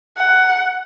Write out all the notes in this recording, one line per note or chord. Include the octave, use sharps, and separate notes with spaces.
F#5